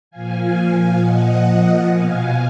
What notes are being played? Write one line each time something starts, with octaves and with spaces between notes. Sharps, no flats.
A#2 F3 F5 G#5
A#2 F3 D#5 F#5
B2 F5 G#5